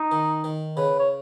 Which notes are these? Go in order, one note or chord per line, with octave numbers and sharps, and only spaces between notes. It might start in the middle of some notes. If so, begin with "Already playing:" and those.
Already playing: D#4
D#3
D#3
C#3 B4
C#5